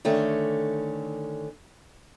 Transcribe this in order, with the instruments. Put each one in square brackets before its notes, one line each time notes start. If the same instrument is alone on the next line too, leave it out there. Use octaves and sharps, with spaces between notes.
[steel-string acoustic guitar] D3 D#3 A3 C#4